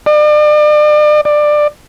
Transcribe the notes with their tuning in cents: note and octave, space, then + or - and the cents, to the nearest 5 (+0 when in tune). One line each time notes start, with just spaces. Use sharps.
D5 +40
D5 +20